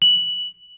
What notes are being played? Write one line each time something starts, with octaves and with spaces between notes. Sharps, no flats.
F#7